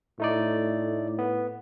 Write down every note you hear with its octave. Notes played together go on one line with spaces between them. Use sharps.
A2 A3 D#4 D5
B3